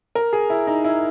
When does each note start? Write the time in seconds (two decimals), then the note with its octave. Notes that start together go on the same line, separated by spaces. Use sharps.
0.15 A#4
0.33 G#4
0.50 E4
0.67 D#4
0.84 E4